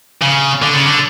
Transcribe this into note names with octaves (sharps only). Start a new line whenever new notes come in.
C#3
D3
C#3
D3